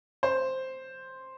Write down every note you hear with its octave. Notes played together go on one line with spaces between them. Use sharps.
C5